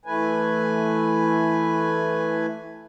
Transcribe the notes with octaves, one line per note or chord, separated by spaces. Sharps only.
E3 A3 B4 G#5